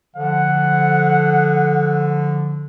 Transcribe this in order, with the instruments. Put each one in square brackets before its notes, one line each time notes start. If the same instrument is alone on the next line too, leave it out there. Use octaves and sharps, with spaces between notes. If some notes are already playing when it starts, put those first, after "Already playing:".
[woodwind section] D3 F3 [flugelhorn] F#5